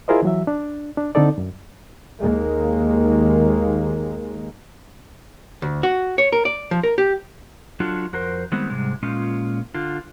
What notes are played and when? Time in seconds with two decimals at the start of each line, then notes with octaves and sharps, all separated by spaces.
0.08 E4 F4 G#4 A#4 C5 D#5
0.23 E3 F#3 E5
0.47 D4
0.97 D4
1.15 D3 C4 D#4 A4 D5
1.38 F#2
2.20 D#2 D#3 G#3 A#3
5.62 D2
5.83 F#4
6.18 C#5
6.33 A#4
6.45 D5
6.71 F3
6.83 A#4
6.98 G4
7.80 F#3 D4 F4 F#4 A4
8.13 F2 F#4 A#4 C5
8.52 D#3 G3 G#3 B3 C4
8.70 G#2 C3 G3 G#3
9.03 A#2 G#3 C#4 F4
9.74 D3 F4